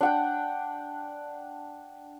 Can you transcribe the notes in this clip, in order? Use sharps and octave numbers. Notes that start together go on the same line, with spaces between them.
D4 F#5 G5